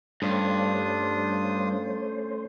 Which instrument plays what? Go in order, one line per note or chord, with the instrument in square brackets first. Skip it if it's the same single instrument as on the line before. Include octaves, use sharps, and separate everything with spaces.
[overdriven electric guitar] G2 [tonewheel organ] A3 C#4 C5 [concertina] D4 F4 D#6